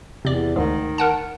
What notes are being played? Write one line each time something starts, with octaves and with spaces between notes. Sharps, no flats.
E2 C3 D5
D2 G#2 D#3
A#4 F#5 A5